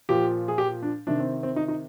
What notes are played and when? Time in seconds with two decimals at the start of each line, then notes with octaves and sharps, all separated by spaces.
0.09 A#2 F3 G4
0.48 G#4
0.58 G4
0.83 D4
1.07 C3 D#3 D4
1.19 C4
1.43 C4
1.56 D#4
1.68 D#4